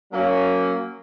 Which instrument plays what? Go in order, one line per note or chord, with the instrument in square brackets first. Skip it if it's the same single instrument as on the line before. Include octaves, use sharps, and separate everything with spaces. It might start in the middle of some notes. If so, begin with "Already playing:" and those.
[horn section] F#3 A#3 C#4